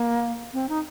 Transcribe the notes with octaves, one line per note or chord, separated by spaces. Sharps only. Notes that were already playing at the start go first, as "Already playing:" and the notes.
Already playing: A#3
C4
D#4